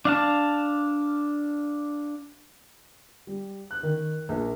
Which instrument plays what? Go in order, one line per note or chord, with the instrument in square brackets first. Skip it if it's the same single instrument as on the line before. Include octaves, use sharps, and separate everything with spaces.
[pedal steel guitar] D4 F5 A5
[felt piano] G3
F#6
D#3
A#1